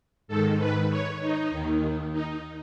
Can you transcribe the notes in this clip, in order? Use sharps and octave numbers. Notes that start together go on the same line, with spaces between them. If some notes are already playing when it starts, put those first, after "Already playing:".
G#2 D#3 A4
B4
C#5
D#4
D#2 D#3
D#4